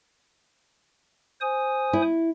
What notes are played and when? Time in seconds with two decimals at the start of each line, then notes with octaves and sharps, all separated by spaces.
1.41 C5 G#5 D#6
1.93 E4